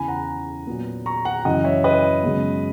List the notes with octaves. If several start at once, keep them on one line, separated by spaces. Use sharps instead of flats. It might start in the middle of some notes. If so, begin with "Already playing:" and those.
Already playing: E2 C#3 E3 G#5 B5
F#5 A#5
A#2 F#3 B3
A#5 C#6
F#5 A#5
F#2 C#3 E3 D#5 F#5
C#5 E5
B4 D#5
F#2 C#3 G#3 B3